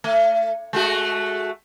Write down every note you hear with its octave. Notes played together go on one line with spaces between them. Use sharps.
A3
G#3 A3 F#4